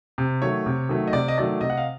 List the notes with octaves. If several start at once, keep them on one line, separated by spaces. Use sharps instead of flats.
C3
D#3 F#3 A3 C#5
C3
D#3 F#3 A3
D#5
C3 D5
D#5
D#3 F#3 A3 D5
C3 D#5
F#5
F5